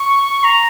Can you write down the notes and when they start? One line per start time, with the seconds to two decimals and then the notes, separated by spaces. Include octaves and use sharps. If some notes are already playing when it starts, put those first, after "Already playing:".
Already playing: C#6
0.44 A#5